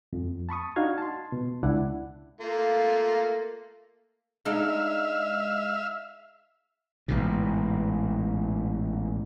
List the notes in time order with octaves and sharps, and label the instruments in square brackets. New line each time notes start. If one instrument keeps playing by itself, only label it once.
[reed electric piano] F2
A5 B5 C#6 D#6
D4 D#4 F#4 F5 G#6
A5 C6
B2
C#2 D4 E4 F#5
[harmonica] A3 A#3 F4
[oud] G#3 D4 D#4 [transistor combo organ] E5 F5
[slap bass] A1 G#2 B2